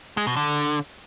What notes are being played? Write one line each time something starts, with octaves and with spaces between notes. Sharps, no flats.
G#3
B2
D3